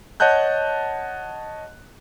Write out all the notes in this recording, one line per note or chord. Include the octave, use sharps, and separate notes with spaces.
C#5 D#5 F#5 A5 F#6 G6